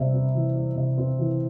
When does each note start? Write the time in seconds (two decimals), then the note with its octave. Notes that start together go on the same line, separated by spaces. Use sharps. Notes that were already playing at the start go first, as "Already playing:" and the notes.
Already playing: C3 G3
0.13 C4
0.35 E3
0.56 G3
0.76 C3
0.98 C4
1.19 E3